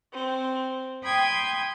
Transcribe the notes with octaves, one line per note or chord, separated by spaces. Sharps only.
C4
G5 B5 C6 D#6 G6 G#6